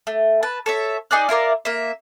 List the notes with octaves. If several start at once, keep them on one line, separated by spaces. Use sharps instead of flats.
A3
B4 A5
A4 C#5 E5
D#4 G#4 D5 F#6
E4 F4 A#4 D5
A#3 E5